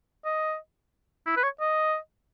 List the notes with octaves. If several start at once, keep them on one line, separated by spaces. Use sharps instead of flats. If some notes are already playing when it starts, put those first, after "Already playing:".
D#5
E4
B4
C#5
D#5